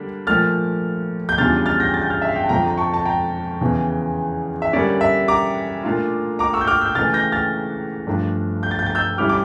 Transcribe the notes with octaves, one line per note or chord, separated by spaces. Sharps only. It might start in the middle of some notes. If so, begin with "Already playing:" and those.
Already playing: D3 G3 A#3 D4
A#2 F3 A3 F6 A6
G6
E2 C#3 G3 D4 F4 F6 A6
F6 A6
G6 A#6
A6
G6
F6 A6
E5
F5
G5
A5
F2 D3 F3 G5 A#5
A#5
A5 C#6
A5
G5 A#5
E2 C#3 E3
E5
D3 G3 A#3 C#4 D5
E5
A#5 D6
A#2 A3 D4 F4
A#5 D6
C#6 E6
G6
D6 F6
E6 G6
C#3 E3 A3 F6 A6
G6 A#6
F6 A6
G2 F3 A3 D4
G6
A6
G6
A6
E6 G6
D3 G3 C#4 E4 D6 F6
D6